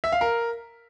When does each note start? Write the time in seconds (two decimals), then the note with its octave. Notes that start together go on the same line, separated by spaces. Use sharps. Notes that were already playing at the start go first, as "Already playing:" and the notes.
0.04 E5
0.12 F5
0.21 A#4